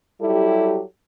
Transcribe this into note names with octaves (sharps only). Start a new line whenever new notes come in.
F#3 G3 E4 G4 A4